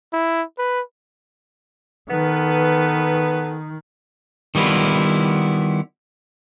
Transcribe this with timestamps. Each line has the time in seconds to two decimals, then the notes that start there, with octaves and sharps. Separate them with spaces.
0.13 E4
0.58 B4
2.10 D#3 B3 A4 B4
4.55 D#3 G3 B3 E4 F4